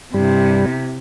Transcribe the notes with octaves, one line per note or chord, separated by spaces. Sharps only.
G2 C3 G3 E4